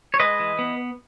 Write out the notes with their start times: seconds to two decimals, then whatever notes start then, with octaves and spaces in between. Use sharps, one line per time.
0.14 C#5
0.20 G#3 B4 D#5
0.40 E3
0.59 B3